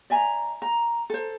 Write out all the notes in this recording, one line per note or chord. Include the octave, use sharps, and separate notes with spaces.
D5 E5 G#5 A#5
A#5
A4 C5